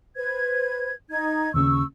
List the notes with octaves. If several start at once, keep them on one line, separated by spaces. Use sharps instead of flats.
B4 C5 G#6
D#4 G#6
D#2 C#3 C#6 E6